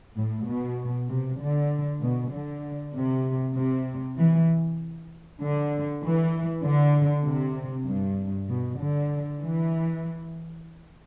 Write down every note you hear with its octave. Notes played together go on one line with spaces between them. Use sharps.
A2
B2
C3
D3
B2
D3
C3
C3
E3
D3
E3
D3
C3
G2
B2
D3
E3